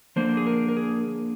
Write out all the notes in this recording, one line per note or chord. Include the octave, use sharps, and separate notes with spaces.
D3 F3 A#3 D4 C5
G#4
A#4
A#4
G#4